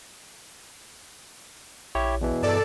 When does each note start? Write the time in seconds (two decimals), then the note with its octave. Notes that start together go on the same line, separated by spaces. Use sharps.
1.95 A#1 E4 G4 C#5
2.21 E2 B2 E3
2.43 G2 A4 D5 A5